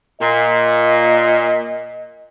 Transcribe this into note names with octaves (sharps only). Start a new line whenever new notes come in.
A#2 D#5